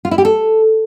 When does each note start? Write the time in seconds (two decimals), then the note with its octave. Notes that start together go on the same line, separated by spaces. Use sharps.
0.05 F4
0.11 E4
0.18 G4
0.25 A4